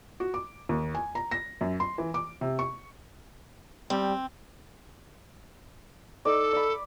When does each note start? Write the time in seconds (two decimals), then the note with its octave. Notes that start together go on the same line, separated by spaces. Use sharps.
0.20 F#4
0.34 D6
0.69 D#2
0.95 G#5
1.15 A#5
1.31 A#6
1.61 F#2
1.80 C6
1.98 E3
2.14 D6
2.41 C3
2.59 C#6
3.90 G3 C4
6.25 D#4 A4 D5
6.53 D5 B5